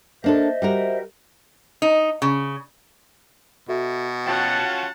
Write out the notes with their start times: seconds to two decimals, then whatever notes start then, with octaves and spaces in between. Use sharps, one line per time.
0.24 A#3 D4 A4 C5 D#5 E5
0.62 G3 F#4 A#4
1.82 D#4
2.22 C#3
3.68 B2 F#4 A4 E5
4.26 C#4 F4 F#4 F#5 G5 A5 G6 A6